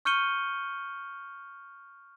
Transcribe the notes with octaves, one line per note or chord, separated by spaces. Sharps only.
C#6 F6 G6 C#7 D#7 G7